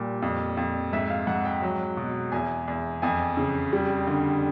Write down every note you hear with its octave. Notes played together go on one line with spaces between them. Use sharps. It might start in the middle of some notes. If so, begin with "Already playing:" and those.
Already playing: A#2 G3
F2
F2
G#2 E5
F5
G#2 F#5
G5
F#3
B2
E2 G#5
E2
F2 G#5
C#3
G3
D3